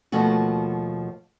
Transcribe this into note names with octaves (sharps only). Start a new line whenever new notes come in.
D#2 B2 F3 A3 F4 F#4